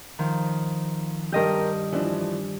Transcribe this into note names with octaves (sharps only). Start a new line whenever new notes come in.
D#3 F3
G2 G4 A#4 D#5 G6
E3 F3 D4